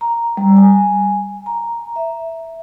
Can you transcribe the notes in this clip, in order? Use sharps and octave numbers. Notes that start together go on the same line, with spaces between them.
A#5
G3
G#5
A#5
E5